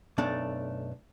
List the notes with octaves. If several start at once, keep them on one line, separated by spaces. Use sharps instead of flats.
B1 F#2 A3 D4